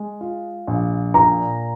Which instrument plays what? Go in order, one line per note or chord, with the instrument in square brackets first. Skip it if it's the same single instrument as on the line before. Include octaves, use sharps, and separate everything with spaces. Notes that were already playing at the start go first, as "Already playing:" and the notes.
Already playing: [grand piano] G#3
F4
A#1
[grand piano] A#2 [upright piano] A#5